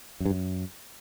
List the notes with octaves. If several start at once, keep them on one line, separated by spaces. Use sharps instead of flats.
F#2
G2
F#2